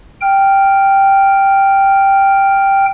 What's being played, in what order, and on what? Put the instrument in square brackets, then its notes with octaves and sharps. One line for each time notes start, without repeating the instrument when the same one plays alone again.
[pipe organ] G5 F6